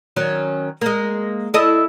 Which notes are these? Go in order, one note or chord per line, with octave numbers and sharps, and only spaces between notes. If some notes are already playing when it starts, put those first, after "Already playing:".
D#3 F#3 C#4
G#3 A#3
E4 A4 D#5